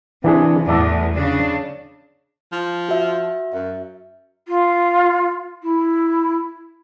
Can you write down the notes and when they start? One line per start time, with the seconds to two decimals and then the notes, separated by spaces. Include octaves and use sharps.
0.24 C3 E3 D4 G#4
0.68 E2 A2 D5 E5 A5
1.15 C#3 D4
2.52 F3
2.89 F#4 E5
3.53 F#2 E5
4.48 F4
5.63 E4